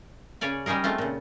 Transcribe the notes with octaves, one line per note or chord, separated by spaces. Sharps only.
C#3 C#4 C#5 D5 G#5
G3 C#4 D#4 G#4 A#4
G#3 A3 C4 F4
A#2 C#3